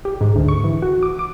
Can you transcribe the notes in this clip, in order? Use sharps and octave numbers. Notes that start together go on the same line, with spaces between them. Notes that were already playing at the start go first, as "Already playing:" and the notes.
G4
G#2
D2
C#6
E3
F#4
D6
D6